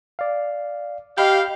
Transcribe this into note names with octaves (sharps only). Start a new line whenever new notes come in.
D5 F5
G4 D#5 F5 B5 G6